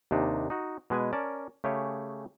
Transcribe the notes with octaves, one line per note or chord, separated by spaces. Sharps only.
D#2 C3 D4 D#4
D#4 F#4
B2 G#3 B4 G#5
C#4 A#4 D5 A5
C#3 A3 G4 G#4 C#5